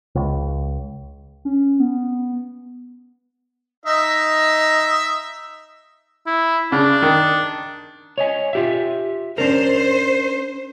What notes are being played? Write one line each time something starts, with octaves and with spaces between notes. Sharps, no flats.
C#2
C#4
B3
D#4 D#5 E5
E4
C#3 D4
D#3
C#5 D#5 G#5
F4 G4 E5
C#4 D4 A#4 C5